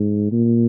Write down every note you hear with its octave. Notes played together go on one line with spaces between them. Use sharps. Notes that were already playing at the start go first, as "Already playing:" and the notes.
Already playing: G#2
A#2